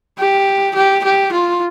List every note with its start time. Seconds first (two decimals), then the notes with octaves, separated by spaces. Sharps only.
0.18 G4
0.75 G4
1.04 G4
1.32 F4